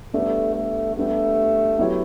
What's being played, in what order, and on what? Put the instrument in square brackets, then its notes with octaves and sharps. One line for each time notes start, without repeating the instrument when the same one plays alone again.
[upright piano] G3 B3 D4 A4 D5 [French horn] A3
[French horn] A3
[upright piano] G3 B3 D4 G4 [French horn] A3
[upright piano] F#3 B3 E4 G4 C#5